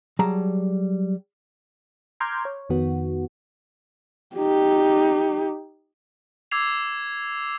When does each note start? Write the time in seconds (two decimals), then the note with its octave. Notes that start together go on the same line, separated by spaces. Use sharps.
0.19 F#3 G3 G#4 A5 A#5
2.20 A#5 C6 D6 F6 G6 G#6
2.45 C#5
2.69 F2 D#3 B3 F#4
4.36 D#4 G4
6.51 D6 E6 G#6 C7 F7